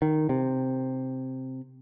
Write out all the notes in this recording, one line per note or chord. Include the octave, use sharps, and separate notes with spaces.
D#3
C3